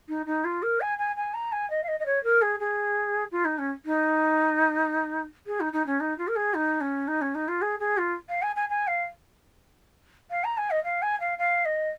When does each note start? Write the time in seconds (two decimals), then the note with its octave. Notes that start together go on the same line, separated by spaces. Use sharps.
0.08 D#4
0.26 D#4
0.44 F4
0.62 A#4
0.81 G#5
0.98 G#5
1.16 G#5
1.34 A#5
1.52 G#5
1.70 D#5
1.83 F5
1.88 D#5
1.99 D#5
2.06 C#5
2.24 A#4
2.42 G#4
2.60 G#4
3.31 F4
3.45 D#4
3.58 C#4
3.85 D#4
5.47 G#4
5.60 D#4
5.73 D#4
5.86 C#4
6.00 D#4
6.18 F4
6.28 A#4
6.36 G#4
6.54 D#4
6.81 C#4
7.08 D#4
7.21 C#4
7.35 D#4
7.48 F4
7.62 G#4
7.79 G#4
7.97 F4
8.29 F5
8.42 G#5
8.56 G#5
8.69 G#5
8.87 F5
10.30 F5
10.44 A#5
10.57 G#5
10.70 D#5
10.84 F5
11.02 G#5
11.20 F5
11.38 F5
11.65 D#5